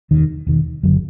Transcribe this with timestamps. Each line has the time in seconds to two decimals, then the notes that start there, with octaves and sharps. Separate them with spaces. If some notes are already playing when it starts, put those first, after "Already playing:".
0.11 E1 D#2 D#3
0.47 E1 D#2 D#3
0.83 F#1 F#2 D3 F#3